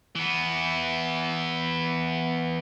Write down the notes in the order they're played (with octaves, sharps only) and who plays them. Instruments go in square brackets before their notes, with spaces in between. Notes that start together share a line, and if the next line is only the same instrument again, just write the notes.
[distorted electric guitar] E3 B3